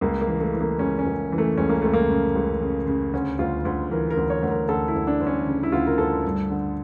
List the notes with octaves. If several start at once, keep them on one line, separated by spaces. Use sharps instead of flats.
C#2 A#3
A#3
E3
A3
E3
A#3
C#2 C#4
C#4
C#2
E3
A3
C#2 C#4
A#3
C#2 A3
A#3
C#3
C#2
C#3
C#3
D2 C#4
D2 F4
D2
E3 A#4
A#4
D2
C#5
D2
A#4
D2 A4
E4
D2
D4
D2
C#4
C#3
E4
D2 F4
A#4
D2 A4
G2
D3